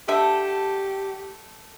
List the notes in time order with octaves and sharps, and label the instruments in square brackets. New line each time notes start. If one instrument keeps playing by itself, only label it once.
[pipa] D3 E5 [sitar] A3 [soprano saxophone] G4